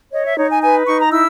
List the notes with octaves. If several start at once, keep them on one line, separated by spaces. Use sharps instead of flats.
C#5 D#5
E5
D#4 C#5
G#5
B4 G#5
D#4 C#6
A#5
E4 E6